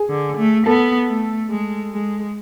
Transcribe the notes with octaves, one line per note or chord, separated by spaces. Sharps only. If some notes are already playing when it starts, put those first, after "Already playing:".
Already playing: G#4 G#5
D3
A3
B3 A4 A5
A3
G#3
G#3